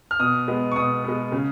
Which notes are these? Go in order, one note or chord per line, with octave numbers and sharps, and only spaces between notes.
F6
B2 D#6
G#3 B3
C#6
B2 D#6
G#3 B3
C#3